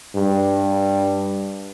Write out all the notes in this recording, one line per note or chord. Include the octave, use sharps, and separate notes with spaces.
G2